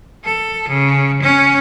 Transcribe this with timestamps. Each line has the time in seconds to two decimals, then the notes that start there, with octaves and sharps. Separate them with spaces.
0.25 A4
0.69 C#3
1.23 C#4